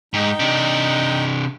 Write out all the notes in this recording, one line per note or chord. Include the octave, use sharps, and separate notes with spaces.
G#2 D#4 G5
C3 D4